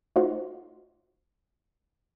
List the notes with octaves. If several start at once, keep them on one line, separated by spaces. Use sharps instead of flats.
A3 D#4 F4 F#4 C5